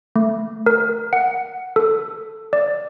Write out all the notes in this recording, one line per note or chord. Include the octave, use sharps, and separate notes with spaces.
A3
A#4
F#5
A4
D5